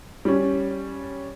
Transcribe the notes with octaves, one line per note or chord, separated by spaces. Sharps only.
G3 C#4